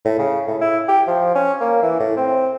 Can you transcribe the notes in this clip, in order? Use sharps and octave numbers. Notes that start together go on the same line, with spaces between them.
A2
C#3
A2
E4
G4
F3
C#4
A#3
E3
A2
C4